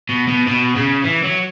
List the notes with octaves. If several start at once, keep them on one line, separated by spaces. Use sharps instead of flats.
B2
B2
B2
C#3
E3
F#3